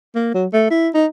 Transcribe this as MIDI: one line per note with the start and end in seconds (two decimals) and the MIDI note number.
0.15 0.32 58
0.34 0.46 54
0.53 0.66 57
0.71 0.89 64
0.94 1.06 63